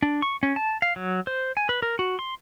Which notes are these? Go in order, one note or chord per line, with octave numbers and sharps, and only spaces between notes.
D4
C#6
C#4
A5
F5
F#3
C5
G#5
B4
A#4
F#4
C6